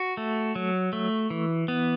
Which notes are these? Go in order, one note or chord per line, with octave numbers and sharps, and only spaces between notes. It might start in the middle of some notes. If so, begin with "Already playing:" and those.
Already playing: F#4
A3
F#3
A3
E3
B3